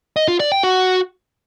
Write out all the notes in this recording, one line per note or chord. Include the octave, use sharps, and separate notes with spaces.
D#5
F4
D5
G5
F#4